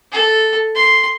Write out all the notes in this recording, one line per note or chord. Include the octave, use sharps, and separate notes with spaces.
A4
C6